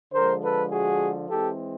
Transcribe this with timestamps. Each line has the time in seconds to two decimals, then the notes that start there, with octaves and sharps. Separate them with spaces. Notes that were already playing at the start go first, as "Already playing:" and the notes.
0.14 D3 F3 G#3 A#4 C5
0.43 A4 B4
0.72 F#4 G#4
1.30 E3 G#3 C4 G4 A4